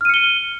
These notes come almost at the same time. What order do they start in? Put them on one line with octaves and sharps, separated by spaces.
F6 D#7 C#7 G7